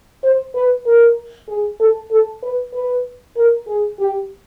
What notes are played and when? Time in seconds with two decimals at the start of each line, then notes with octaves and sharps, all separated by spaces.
0.24 C5
0.55 B4
0.86 A#4
1.48 G#4
1.80 A4
2.11 A4
2.43 B4
2.74 B4
3.36 A#4
3.67 G#4
3.99 G4